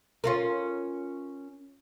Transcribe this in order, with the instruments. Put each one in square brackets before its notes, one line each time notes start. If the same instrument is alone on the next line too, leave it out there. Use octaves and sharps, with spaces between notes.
[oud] C#4 F4 A#4